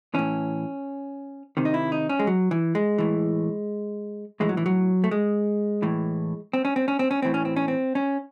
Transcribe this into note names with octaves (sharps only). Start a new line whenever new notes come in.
A2 E3 C#4
C3 D#3
D#4
E4
D#4
C#4
G#3
F#3
E3
G#3
A2 E3
A2 E3 G#3
F#3
E3
F#3
A3
G#3
A2 E3
C4
C#4
C4
C#4
C4
C#4
A2 E3 C4
C#4
C4
C#4
C4
C#4